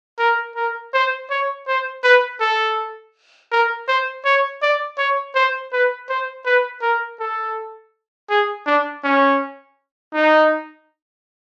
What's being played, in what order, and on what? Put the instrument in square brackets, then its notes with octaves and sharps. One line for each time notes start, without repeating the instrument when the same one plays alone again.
[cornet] A#4
A#4
C5
C#5
C5
B4
A4
A#4
C5
C#5
D5
C#5
C5
B4
C5
B4
A#4
A4
G#4
D4
C#4
D#4